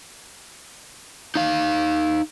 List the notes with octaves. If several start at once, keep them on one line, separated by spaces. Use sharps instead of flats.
D#4 F5